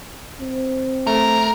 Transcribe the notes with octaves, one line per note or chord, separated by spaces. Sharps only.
C4
A3 A#4